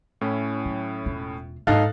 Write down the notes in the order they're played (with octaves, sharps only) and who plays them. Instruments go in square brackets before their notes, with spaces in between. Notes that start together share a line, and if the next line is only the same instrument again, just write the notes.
[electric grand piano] A2 C#4 E4
[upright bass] F#3
E1 F4
[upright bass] G#2 [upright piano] D#4 A4 F5 [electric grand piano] F#6 A6